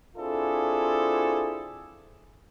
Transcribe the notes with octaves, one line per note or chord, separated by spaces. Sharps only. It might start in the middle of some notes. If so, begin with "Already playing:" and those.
C4 D4 E4 F4 G#4 A4